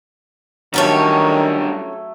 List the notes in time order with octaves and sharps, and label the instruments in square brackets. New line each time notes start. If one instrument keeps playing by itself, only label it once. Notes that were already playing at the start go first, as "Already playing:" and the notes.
[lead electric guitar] D3 G3 [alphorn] D#3 [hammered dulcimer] F#3 A3 [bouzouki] C#4 A4 C#5